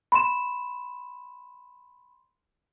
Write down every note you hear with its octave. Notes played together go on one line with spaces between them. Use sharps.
B5 C6 E7